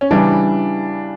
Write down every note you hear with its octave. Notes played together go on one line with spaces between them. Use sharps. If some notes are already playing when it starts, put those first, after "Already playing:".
C#4
C#3 E3 G3 D4